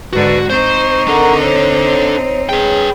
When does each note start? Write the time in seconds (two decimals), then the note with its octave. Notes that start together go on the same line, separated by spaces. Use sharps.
0.13 G#2 D3 F#4 B4
0.50 C4 D#4 C5 C#6
1.08 D4 A4 A#4 F#5 A#5
1.43 C5 C#5
2.49 G#4 B4 G5